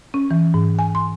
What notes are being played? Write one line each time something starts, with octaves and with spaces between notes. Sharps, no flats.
C#4
E3
G#2
G#5
C6